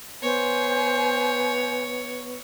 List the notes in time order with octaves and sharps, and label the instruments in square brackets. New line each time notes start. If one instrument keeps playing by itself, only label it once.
[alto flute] B3 [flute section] C5 G#5 [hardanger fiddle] C#5